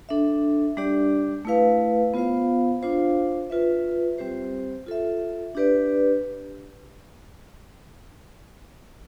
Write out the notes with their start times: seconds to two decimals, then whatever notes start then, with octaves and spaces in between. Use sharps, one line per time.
0.09 D4 A4 E5
0.77 G3 D4 G4 D5
1.45 A3 E4 B4 F5
2.14 B3 F4 C5 F5
2.81 D4 F4 C5 F5
3.50 F4 B4 E5
4.18 G3 C4 G4 C5
4.86 F4 A4 E5
5.55 D4 G4 B4 D5